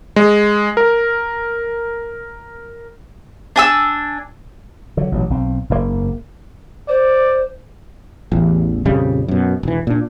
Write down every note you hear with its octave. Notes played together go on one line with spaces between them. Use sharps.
G#3
A#4
D4 G#5 E6
D3 F#3
A1 B2 F#3
B1 C4
F#1 G#2 C#3 A#3
C5 D5
A1 E2
A#1 F2 C#3 G3
F#2 B2
E1 E3
A#2 D4